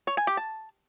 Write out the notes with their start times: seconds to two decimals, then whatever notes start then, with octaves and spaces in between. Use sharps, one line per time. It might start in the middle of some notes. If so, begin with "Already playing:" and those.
0.07 C#5
0.17 G#5
0.27 G4
0.37 A5